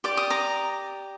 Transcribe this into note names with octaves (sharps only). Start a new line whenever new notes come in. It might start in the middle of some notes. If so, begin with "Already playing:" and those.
G4 D5 D6
D#6
A#5 D6